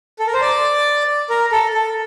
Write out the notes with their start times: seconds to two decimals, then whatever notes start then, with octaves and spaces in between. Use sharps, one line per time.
0.19 A4
0.27 A#4
0.34 C5
0.41 D5
1.30 A#4
1.52 A4
1.74 A4